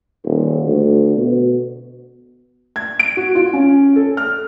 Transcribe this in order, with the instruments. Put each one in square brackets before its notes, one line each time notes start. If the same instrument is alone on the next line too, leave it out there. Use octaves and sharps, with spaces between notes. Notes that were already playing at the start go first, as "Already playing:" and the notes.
[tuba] D#1
D2
B2
[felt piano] G#6
D7
F#4
F4
C#4
A4
F6